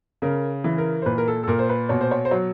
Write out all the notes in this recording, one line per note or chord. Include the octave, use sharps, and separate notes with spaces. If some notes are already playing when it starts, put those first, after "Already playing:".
C#3 A#4
E3
A#4
C5
A#2 B4
A#4
A4
A4
A#2 A#4
C5
B4
B2 C#5
C5
C#5
C5
F#3 C#5